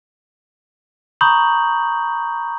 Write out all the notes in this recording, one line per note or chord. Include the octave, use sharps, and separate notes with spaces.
A#5 B5 C#6 D#6 G6 F#7